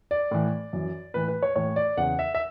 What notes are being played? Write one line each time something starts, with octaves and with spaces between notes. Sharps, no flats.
D5
A2 E3
F#2 E3
A2 E3 B4
B4
C#5
A2 E3 C#5
D5
E2 C#3 E3 F#5
E5
E5